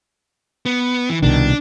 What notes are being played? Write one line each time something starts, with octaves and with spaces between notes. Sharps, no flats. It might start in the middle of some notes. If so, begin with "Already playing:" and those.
B3
E3
C2 B2 D#3 D4